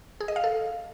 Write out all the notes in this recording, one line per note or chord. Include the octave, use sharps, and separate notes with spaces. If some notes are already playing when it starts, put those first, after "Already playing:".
G#4
D#5
F5
A4